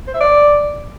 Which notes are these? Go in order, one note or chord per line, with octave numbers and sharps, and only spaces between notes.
C5
E5
D5